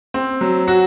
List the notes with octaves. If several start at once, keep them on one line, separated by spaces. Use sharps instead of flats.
C4
F#3
F#4